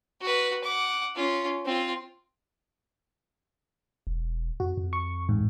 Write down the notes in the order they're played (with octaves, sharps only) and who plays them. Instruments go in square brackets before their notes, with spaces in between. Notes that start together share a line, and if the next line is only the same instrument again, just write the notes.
[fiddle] F#4 B4
F#5 D6
C#4 F4
C4 F4
[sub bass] E1
[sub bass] F2 [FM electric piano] F#4
[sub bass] F2
[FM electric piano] C#6
A1 G#2